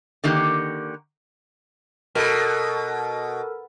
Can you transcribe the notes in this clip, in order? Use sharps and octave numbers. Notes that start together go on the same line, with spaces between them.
D3 D#3 A#3 G4
B2 A4 A#4